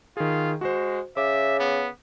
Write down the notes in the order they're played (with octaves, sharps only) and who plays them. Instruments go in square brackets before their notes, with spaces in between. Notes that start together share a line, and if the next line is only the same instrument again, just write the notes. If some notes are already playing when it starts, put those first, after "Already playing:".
[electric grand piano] D#3 G#4 [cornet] F4
[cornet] G#3 [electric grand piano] F#4 C5
[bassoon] C#3 [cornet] E5 [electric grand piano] D6
[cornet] B3